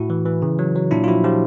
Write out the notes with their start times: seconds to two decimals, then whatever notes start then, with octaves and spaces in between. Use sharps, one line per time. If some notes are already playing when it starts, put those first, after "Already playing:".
Already playing: A2 E4 F#4
0.10 E3
0.26 E3
0.42 C#3
0.59 F#3
0.75 F#3
0.91 A#2 D4 E4
1.04 F4
1.08 F3 E4 F#4
1.24 F3 F4 G4